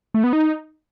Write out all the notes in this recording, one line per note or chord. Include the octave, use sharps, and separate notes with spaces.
A3
B3
D#4